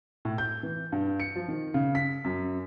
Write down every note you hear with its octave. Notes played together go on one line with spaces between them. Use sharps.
A2
G6
E3
G2
C#7
F3
D#3
C#3
B6
F#2